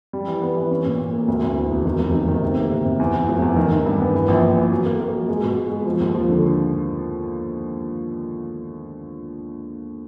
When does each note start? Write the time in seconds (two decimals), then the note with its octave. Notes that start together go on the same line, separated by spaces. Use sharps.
0.13 G3
0.28 E3
0.42 B3
0.56 E3
0.71 C#4
0.85 A#2
0.99 A#2
1.13 A#3
1.28 D2
1.43 D2
1.57 E3
1.71 E1
1.85 D#3
1.99 F1
2.14 D#3
2.28 D#3
2.42 C3
2.56 A#3
2.71 C3
2.85 C3
2.99 E2
3.14 E2
3.29 F1
3.42 E2
3.56 D#3
3.72 D#3
3.86 G2
4.00 B3
4.14 E3
4.28 A#1
4.43 A#1
4.57 E3
4.71 F#3
4.86 A#3
5.00 A#3
5.15 F#3
5.29 G#3
5.43 B2
5.57 G#3
5.72 G#3
5.86 F3
6.00 D#2
6.15 F3
6.29 D3